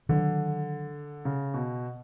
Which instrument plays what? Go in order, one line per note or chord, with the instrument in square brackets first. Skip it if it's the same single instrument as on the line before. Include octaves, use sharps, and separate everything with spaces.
[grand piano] D3 [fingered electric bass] D#3 F#3 B3 D4
[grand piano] C#3
B2